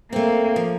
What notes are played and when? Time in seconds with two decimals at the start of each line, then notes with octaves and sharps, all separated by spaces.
0.12 A3 A#3 C4
0.56 F3